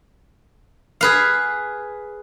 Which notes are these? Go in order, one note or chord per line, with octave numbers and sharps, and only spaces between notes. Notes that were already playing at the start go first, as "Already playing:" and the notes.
G#4 B4 F5